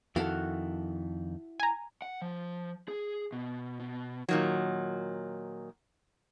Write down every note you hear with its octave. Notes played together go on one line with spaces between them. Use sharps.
F2 D#3 E4 F#4 A4 F5
G#5 A#5
F#5
F3
G#4
B2
B2
A#2 D#3 F#3